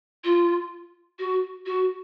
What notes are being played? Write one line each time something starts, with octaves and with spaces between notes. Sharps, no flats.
F4
F#4
F#4